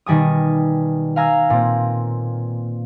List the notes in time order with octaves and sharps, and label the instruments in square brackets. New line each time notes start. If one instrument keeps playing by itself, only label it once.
[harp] B2 D#3 G3 G#5 D#6
F5 G#5 A#5 E6
A#2 C4